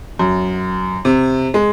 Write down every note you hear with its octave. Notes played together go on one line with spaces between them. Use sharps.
F#2
C3
G#3